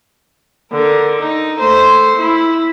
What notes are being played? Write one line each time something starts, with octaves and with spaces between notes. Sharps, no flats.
D3 A#4
D#4
A3 C5
E4